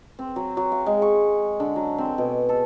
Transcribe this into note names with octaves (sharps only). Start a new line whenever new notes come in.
C4
F#3
F#3
F5
G#3
C#6
D3
F#3
C4
B2
A4